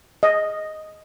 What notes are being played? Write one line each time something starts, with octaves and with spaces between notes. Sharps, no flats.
D#5